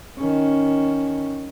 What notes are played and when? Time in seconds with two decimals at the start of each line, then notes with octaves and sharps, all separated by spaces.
0.17 D#3 C#4